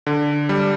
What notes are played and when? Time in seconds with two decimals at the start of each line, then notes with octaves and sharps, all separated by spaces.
0.07 D3
0.49 G3